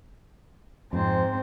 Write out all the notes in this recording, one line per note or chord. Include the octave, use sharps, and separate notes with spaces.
F2 G#2 C4